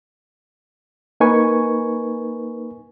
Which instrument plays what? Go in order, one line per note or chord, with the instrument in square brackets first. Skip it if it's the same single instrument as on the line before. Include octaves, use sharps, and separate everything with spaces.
[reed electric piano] A#3 D#4 A#4 B4 G#5 C#6